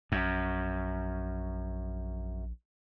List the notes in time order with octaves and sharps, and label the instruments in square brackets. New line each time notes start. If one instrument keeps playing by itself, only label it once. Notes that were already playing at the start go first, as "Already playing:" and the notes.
[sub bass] A#1 [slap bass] F#2